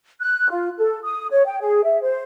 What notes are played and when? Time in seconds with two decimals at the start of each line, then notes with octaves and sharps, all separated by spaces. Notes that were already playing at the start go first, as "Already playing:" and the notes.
0.21 F#6
0.50 F4
0.78 A4
1.04 D#6
1.31 C#5
1.46 G5
1.61 G#4
1.84 E5
2.02 C5